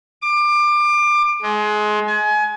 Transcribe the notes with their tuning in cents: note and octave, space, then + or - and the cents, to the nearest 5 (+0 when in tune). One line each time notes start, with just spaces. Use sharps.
D6 +25
G#3 +25
G#5 +30